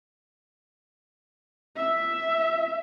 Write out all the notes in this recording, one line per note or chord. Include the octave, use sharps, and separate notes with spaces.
E5